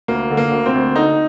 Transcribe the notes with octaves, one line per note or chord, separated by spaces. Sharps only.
D2 A#3
D3
A#3
D2
C4
D2
D3 D#4